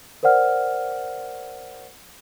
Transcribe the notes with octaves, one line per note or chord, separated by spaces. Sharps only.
A#4 C5 D5 F#5 F6